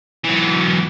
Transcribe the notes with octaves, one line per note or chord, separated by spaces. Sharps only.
E3 F#3